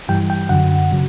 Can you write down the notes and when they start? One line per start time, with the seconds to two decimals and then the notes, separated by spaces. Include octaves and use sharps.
0.09 G2 E3 G3 G5
0.30 G5
0.49 F#2 D3 F#3 F#5
0.91 C#3 F#3